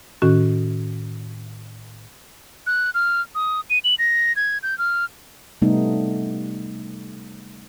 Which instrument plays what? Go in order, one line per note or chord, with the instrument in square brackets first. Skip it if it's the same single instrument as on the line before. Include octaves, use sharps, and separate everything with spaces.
[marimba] A2 D#3 C#4 F#4
[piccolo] F#6
F6
D#6
D#7
F#7
A#6
G#6
G6
F6
[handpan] C3 G3 A3 B3 D#4